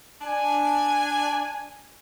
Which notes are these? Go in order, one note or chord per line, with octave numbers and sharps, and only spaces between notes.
D4 G#5